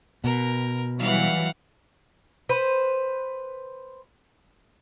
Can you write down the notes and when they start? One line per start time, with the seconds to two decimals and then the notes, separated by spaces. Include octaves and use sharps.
0.24 B2 A#4
0.99 E3 F#3 G3 F5 F#5
2.49 B4 C5